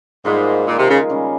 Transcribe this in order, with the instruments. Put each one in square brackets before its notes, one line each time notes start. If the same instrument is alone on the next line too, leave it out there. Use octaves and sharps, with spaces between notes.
[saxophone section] G#2 [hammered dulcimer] D#3 G3 A#3 F4
[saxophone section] A#2 [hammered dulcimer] D#3 G#3 D#4 G#4
[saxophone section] C3
C#3
[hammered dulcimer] C#3 G3 C#4